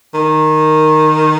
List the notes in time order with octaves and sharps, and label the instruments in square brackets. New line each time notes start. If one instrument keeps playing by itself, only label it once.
[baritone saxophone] D#3